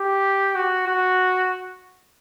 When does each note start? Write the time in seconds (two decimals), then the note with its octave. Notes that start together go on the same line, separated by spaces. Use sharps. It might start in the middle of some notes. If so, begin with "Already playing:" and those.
Already playing: G4
0.55 F#4
0.87 F#4